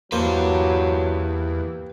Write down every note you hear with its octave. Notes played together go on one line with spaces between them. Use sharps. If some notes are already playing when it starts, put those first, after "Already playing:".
E2 F#3 A#3 G4 B4 C5 C6